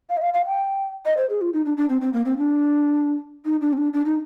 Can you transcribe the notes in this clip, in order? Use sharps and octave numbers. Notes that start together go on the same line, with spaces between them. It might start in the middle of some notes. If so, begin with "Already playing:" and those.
F5
D#5
F5
F5
G5
D#5
C5
G#4
F4
D#4
D4
D4
C4
C4
A#3
C4
D4
D#4
D4
C4
D4
D4
D#4